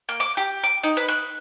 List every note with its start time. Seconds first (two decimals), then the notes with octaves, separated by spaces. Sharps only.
0.09 A#3
0.20 D6
0.37 G4
0.64 D6
0.84 D#4
0.97 B4
1.08 F#6